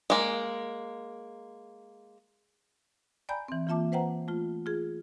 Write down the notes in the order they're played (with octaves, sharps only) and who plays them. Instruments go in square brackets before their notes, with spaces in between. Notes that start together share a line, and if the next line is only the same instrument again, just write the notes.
[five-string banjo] G#3 A#3
[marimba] D5 G5 G#5 A#5 B5 G6
E3 C4
E3 A#3 F4 E5 A5 D6
B4 C5 F#5 G5 A#5
A3 F4
F4 G#4